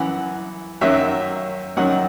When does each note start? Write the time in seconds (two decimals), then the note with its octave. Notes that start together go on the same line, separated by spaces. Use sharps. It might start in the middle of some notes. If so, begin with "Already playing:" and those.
Already playing: F#2 E3 F#5
0.81 F#2 D#3 F#3 E5
1.77 F#2 D#3 F#3 F#5